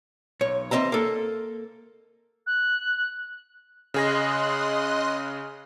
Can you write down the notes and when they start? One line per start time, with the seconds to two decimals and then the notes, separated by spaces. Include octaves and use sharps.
0.41 B1 C#5
0.71 E3 C4 D#5 E5 A#5
0.92 A#3 A4
2.46 F#6
3.94 C#3 G#4 D#5 C6 F#6 A#6